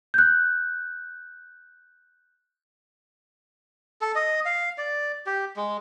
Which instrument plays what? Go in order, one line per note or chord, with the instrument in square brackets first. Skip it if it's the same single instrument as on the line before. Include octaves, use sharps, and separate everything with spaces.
[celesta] F#6 G6
[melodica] A4
D#5
F5
D5
G4
G#3